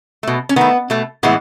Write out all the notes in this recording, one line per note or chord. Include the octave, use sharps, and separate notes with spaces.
B2 A3
C#4
D#3 A3 B3
B2 A3
A2 E3 G#3 B3